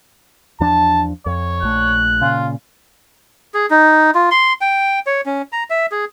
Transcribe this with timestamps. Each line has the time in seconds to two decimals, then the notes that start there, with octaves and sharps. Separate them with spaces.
0.60 E2 F3 D4 A5
1.26 F2 C#5
1.62 A#1 A3 F#6
2.22 A#2 C#3 F4
3.54 G#4
3.70 D#4
4.15 F4
4.31 C6
4.61 G5
5.07 C#5
5.26 C#4
5.52 A#5
5.70 E5
5.92 G#4